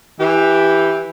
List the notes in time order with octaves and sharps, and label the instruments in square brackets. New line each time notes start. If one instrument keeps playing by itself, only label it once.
[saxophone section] E3 G4